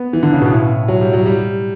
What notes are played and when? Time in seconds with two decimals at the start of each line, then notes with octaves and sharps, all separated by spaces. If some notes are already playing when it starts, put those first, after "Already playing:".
Already playing: B3
0.13 E3
0.23 D3
0.32 C#3
0.41 B2
0.51 A2
0.88 F#3
1.01 G3
1.13 F#3
1.26 G3